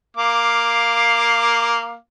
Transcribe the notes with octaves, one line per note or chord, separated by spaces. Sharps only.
A#3 F5 D6